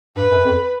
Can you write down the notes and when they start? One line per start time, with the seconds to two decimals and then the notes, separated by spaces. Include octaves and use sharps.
0.16 G2 B4
0.31 F#2
0.45 F2